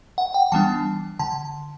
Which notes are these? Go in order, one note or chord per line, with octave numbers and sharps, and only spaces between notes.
F#5
G5
E3 G3 B3 D4 A5
D3 A5